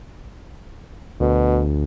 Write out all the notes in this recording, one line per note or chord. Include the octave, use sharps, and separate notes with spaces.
D2 B2